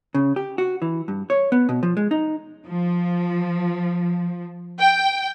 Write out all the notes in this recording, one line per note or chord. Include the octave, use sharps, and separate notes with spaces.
C#3
G4
F#4
E3
G2
C#5
B3
B2
F3
G#3
D#4
F3
G5